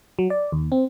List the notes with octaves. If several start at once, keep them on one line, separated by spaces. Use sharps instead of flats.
F#3
D5
D#2
C4